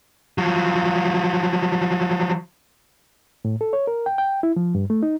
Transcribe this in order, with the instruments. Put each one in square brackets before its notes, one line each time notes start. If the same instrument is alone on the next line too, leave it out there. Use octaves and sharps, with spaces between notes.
[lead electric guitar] F3 F#3
[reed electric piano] A2
A4
C#5
A#4
G5
G5
E4
F3
G2
A3
D#4